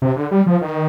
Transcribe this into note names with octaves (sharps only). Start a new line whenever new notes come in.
C3
D3
G3
F3
D#3